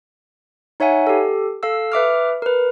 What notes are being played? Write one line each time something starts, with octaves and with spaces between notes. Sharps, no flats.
D#4 C#5 E5 F#5 G#5
G4 A4
A4 F5 E6
B4 E5 D6 F6
A#4 B4